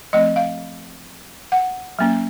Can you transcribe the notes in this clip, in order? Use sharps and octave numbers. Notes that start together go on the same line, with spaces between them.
F3 A3 C4 D#5
F5
F#5
F#3 A#3 C#4